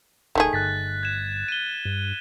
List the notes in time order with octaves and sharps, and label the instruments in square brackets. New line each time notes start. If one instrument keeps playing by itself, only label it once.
[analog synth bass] D1 [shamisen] D#3 A3 G#4
[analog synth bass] G1 [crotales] F#6 A6 B6
[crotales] G#6 E7
D#7 G7
[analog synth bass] G2